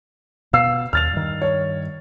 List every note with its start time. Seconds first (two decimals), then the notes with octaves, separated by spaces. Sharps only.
0.53 B2 B3 F5 E6 C7
0.93 D#2 F6 A6 F7
1.13 G2 D#3
1.42 C#5